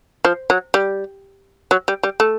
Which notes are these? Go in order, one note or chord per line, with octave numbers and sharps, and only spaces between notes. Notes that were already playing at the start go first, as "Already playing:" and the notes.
F3
F#3
G3
F#3
G3
G3
A3